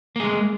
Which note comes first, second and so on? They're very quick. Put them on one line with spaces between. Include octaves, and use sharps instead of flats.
A#3 G#4 G#3